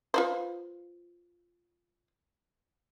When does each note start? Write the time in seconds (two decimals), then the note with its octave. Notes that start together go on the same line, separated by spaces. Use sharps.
0.14 F4 B4 C5